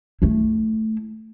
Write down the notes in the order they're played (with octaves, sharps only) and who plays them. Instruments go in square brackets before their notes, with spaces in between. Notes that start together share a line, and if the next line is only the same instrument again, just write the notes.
[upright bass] A3 E4